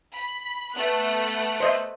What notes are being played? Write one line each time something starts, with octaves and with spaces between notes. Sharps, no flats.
B5
A3 B3 F#6
C5 D#5 E5